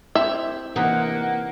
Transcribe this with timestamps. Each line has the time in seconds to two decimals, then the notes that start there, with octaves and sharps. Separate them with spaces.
0.15 C4 E4 G4 E5
0.76 C3 E3 A#3 D#4 F#5